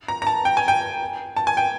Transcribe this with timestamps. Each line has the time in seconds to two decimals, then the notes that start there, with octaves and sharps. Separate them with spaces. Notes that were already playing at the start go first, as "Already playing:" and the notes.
0.08 A#5
0.22 A#5
0.27 A5
0.45 G5
0.57 G#5
0.68 G5
1.36 A5
1.47 G#5
1.57 G5